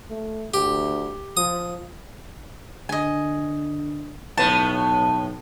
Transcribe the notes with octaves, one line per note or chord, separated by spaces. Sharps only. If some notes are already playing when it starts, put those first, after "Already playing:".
A3
D2 G4
F3 D#6
D3 D#5 G#5
B1 A2 B3 A5